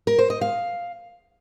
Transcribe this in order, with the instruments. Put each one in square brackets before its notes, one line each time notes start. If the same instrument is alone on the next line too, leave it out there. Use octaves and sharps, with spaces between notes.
[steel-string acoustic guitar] A#4
C5
D#5
F5